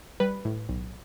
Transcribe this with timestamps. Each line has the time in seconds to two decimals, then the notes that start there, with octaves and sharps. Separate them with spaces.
0.20 G3 B4
0.45 A2
0.69 B1